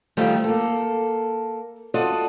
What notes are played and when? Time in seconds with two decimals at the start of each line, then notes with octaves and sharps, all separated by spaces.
0.17 D#3 F3 G3 A3 F4 G4
0.44 A#3 A4
1.94 F4 F#4 A4 D5 D#5